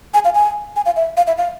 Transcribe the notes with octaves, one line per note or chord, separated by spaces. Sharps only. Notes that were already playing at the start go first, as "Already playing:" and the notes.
G#5
F5
G#5
G#5
F5
E5
F5
E5
F5